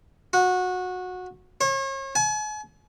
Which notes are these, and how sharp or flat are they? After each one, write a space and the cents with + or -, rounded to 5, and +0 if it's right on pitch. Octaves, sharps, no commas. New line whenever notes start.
F#4 -20
C#5 -40
G#5 +40